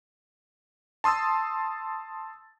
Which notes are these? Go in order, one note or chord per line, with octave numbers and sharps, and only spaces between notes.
A5 C6 D#6 E6 A6